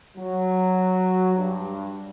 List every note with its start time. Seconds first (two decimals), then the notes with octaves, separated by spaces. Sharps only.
0.18 F#3
1.36 G2